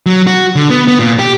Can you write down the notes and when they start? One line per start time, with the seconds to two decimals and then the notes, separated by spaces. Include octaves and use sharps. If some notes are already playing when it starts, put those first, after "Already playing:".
0.06 F#3
0.27 F#4
0.56 D3
0.70 B3
0.88 B3
0.99 A#2
1.19 G4